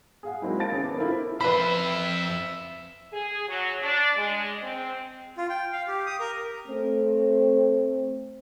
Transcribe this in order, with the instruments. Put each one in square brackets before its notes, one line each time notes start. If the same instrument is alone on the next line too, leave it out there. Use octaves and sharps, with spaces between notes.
[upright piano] G#4 F5 F#5
F#3 G#3 A#3 C4 D#4 E4
F5 A5 A6 D7
D#3 C4 C#4 G#4 C#5
B3 D6
C#4 E4 F4 A4 A#4 C5
[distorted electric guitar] F2 C5 [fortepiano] B4 B5 [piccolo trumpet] E5
[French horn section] G#4
F#3
D4
G#3
C4
[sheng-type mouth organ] F4
G5
F5
G4
D#6
A#4
[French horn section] A3 C4